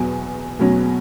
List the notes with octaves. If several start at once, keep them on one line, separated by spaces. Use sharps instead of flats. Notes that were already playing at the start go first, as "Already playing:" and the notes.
Already playing: E2 B2 F#3
E2 B2 F#3 C#4